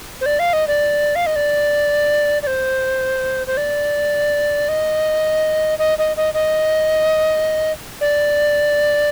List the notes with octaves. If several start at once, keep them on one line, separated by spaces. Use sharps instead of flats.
C5
D5
F5
D#5
D5
F5
D#5
D5
D5
C5
C5
D5
D#5
D#5
D#5
D#5
D#5
D5